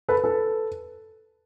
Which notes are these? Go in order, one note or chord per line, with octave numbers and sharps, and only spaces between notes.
A4 B4
A4 B4